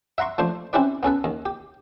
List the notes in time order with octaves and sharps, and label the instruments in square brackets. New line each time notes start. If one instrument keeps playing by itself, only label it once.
[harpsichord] E5 F#5 A#5 C6 C#6
F3 A3 D4 C5
C4 C#4 E4 G4 B4 D5
B3 C#4 A4 B4
D#2
G4